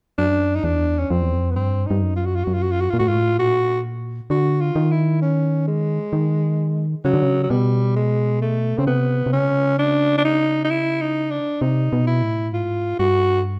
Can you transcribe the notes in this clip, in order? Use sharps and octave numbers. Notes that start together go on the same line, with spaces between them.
F#2 D4
D#4
E2 D4
C#4
F2 C4
E2
F2
B3
G2 C4
G2 D#4
F#2
F4
F#4
F4
F#2 F#4
F4
F#4
F4
F#4
A#2 F4
A2 F#4
G#2 F4
A2
A#2 F#4
D3 F#4
F4
D#3
E4
C#4
G#3
D#3
C#3 F#3
D3
C#3
F#3
B2 G3
G#3
A3
C#3 C4
C3 B3
C3
C#3 C#4
D4
D4
D#4
D#4
E4
D#4
D4
C3 D#4
B2
E4
A2
G#2 F4
G2 F#4